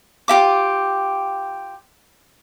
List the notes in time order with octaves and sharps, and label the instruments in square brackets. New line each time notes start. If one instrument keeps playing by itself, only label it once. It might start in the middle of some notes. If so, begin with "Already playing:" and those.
[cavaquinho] F4 G4 E5 D6